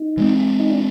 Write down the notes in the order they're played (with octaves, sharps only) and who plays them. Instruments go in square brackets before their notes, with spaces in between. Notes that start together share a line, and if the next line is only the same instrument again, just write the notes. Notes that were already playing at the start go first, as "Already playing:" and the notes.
Already playing: [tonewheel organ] D#4
[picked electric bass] E3 G#3 C4
[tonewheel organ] D#4
D4